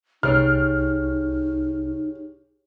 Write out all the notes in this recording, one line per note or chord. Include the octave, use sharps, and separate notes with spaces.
C2 D#4 G4 G#4 C#5 F6